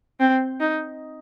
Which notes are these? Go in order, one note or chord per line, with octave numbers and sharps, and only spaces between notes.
C4
D#4